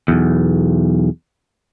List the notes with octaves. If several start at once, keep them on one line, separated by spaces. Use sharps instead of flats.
B1 E2